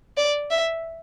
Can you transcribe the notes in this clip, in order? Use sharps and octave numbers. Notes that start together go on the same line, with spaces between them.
D5
E5